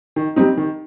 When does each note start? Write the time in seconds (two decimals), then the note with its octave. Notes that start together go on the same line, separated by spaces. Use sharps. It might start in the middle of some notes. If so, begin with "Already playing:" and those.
0.16 D#3
0.36 G3 C4 D#4
0.57 D#3